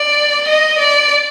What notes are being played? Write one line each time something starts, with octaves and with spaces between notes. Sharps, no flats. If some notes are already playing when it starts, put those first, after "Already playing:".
Already playing: D5
D#5
D5